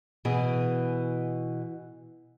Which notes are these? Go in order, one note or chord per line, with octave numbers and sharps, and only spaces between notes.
B2 E3 G#4